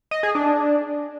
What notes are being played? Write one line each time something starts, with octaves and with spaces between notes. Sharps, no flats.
D#5
G#4
D4